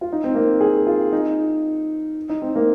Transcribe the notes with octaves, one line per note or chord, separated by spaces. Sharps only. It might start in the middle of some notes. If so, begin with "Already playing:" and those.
F4
D#4
C4
A#3
G#4
F4
D#4
D#4
C4
A#3